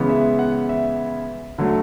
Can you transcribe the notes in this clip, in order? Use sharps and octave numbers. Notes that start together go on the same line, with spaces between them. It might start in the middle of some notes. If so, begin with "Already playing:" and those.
Already playing: C#3 E3 G#3 B3
E5
F#5
E5
D3 F#3 A3